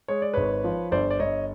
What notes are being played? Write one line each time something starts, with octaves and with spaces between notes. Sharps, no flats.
G#3 C#5
D5
G#1 B4 C#5
F3
G1 C5 D5
D5
G1 C#5 D#5